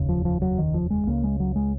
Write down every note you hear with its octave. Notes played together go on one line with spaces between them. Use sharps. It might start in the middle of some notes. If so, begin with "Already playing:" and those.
Already playing: F1 D#2 C#3
F3
F3
F#3
D#3
F3
G#3
C#2 C#3 A#3
G#3
F#3
G#3